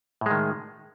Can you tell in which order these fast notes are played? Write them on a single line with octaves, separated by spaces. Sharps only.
A2 G#3 D#3